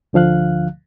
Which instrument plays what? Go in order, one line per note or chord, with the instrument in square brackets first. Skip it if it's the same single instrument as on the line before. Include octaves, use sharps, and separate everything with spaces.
[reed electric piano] D2 D3 F3 F5 F#6